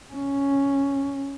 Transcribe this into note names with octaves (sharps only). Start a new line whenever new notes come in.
C#4